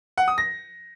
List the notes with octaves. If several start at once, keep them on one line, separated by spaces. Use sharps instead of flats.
F#5
D#6
A#6